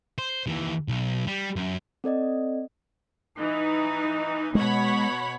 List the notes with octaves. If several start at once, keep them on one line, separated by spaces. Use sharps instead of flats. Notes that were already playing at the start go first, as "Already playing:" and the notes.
C5
D#2 E3
B1
G3
F#2
C4 A4 D5 D#5
E3 D#4
B2 G#3 C#5 F#5 B5